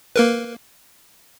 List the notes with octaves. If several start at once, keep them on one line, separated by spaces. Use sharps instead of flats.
A#3 A#4 B4